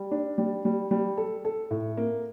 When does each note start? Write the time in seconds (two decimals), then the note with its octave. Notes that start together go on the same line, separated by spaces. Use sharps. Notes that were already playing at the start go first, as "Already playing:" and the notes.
Already playing: G3
0.11 D4
0.38 G3
0.65 G3
0.91 G3
1.18 A4
1.45 A4
1.71 A2
1.97 A#3